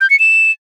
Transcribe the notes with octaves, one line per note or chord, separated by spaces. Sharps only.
G6
C#7
E7